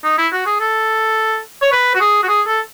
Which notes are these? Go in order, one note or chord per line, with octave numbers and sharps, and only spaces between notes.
D#4
E4
F#4
G#4
A4
C#5
B4
F#4
G#4
F#4
G#4
A4